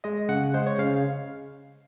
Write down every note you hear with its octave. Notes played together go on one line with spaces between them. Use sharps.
G#3 D#5
C#3 F#5
G#3 C5
C#5
C#3 F5